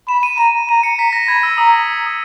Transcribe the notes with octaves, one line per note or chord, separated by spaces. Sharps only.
B5 E7
D#7
A#5 D#7
A#5 D#7
C#7
A#5 B6
A#6
B5 G#6
E6
A#5 D#6
D#6